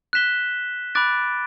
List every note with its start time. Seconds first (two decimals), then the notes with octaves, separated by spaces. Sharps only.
0.13 F#6 B6 E7 G7
0.95 B5 D6 F#6 A6 D7